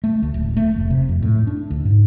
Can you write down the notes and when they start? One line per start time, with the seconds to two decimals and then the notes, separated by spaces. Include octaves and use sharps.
0.04 A3
0.22 D2
0.34 D1
0.57 A3
0.76 F1
0.90 C3
1.09 F2
1.22 A2
1.47 D4
1.70 D2
1.85 G#2